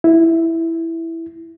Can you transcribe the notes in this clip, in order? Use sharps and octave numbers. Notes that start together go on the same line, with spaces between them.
E4